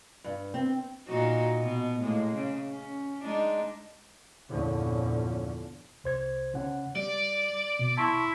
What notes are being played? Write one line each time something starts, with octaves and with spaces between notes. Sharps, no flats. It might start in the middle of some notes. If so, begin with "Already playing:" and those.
G2
C4
A#2 D#4 F#4
B2 B3
A2 G#3 A#3
C#3
C#4
G#3 D4 D#4
E2 G2 A#2 D3 F3 C#4
C2 C5 G#6
C#3 C#4 F#5
G3 D5
B2
E4 A5 C6 C#6